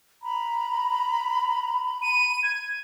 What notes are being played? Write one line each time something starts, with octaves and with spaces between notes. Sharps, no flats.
A#5 B5
D#7
G#6